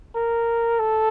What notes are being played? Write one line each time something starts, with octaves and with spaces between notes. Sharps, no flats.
A#4
A4